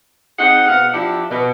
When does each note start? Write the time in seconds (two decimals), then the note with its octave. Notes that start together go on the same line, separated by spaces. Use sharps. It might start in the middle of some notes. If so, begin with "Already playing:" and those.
0.39 C4 D#4 G#4 F#5
0.68 B2 F5 F#5
0.93 F3 D4 E4 G4
1.31 B2